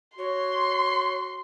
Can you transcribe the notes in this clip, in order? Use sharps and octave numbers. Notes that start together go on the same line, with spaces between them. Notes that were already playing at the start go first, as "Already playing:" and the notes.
F#4 C#5 C6